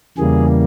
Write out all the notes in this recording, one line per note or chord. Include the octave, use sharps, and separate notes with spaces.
E2 C#3 E3 G3 A#3 G#4